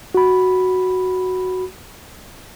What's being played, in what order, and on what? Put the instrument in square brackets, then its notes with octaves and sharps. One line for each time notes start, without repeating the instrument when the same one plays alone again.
[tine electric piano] F#4 B5